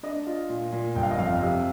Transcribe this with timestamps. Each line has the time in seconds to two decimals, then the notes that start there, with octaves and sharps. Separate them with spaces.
0.03 D4 D#5
0.26 F4
0.49 A#2
0.72 A#2
0.95 G1 G5
1.03 F5
1.11 D#5
1.18 F2 F5
1.41 C3